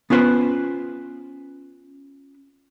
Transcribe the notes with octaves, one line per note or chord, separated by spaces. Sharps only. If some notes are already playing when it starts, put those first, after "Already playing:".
B3 C#4 F4 B4 C5